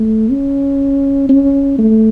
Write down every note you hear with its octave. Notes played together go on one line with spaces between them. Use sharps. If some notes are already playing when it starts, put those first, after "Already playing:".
Already playing: A3
C#4
C#4
A3